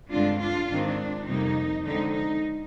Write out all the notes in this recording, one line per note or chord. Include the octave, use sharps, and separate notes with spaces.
G2 D3 G#3 C4 D4 F4
D4 F4
G#2 D#3 G#3 C4 D4
F2 C3 G3 A#3 D#4
D3 F3 G#3 C4 D#4
D#4